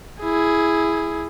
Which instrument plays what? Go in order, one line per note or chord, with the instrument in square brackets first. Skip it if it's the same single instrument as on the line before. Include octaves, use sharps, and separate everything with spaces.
[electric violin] E4 G#4